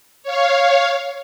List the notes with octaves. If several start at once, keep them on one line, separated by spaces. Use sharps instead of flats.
C#5 F5